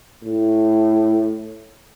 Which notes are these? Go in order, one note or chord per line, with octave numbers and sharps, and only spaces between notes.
A2